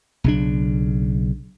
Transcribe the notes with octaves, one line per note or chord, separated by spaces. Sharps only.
B1 C#3 D4